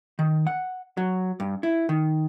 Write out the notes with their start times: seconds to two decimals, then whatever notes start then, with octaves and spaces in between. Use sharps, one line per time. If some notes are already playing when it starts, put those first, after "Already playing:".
0.19 D#3
0.47 F#5
0.97 F#3
1.40 G2
1.63 E4
1.89 D#3